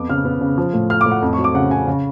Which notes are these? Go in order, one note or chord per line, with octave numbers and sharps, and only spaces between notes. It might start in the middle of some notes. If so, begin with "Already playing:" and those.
Already playing: F2 B3 D6
C#3 F6
B3
C#3
F3
A2
A3 F6
D6
A2
F#5
F2
C#6
F#3
D6
C#3 F#5
F2 G#5
C#3